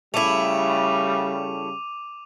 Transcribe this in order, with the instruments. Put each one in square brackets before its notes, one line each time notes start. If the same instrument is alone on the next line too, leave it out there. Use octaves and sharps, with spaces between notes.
[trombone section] C#3 G3 [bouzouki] A3 E4 [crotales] D6 D#7 F7